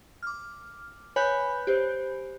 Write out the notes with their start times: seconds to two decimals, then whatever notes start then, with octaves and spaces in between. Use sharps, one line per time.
0.23 D6 F6
1.16 B4 C#5 G#5 B5 F#6 G6
1.67 G4 C5